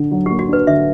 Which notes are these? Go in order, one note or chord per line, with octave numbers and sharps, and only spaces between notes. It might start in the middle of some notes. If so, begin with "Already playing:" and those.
Already playing: D3 D4
F#3
G4
A#3
F#4
D4 B4
D3 E5